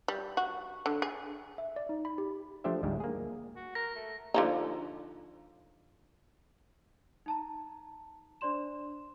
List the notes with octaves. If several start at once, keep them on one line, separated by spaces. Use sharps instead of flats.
G3
F#4
D3
G#4
E5
D5
D#4
B5
G4
F3 A3 D4 G4 C5 E5
D2 G#2 G3 G#3
A#3 G#4
F#4
A#4 A#6
A3
D3 F3 D#4
D#4 A5 A#5
D4 C5 D5 C6 E7